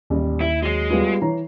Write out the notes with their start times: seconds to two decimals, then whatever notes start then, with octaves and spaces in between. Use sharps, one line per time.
0.10 A1 D#2 G3
0.41 E4
0.63 F#3 G#3 C7
0.90 G3 B3 F4
1.22 E3 C#5 A#5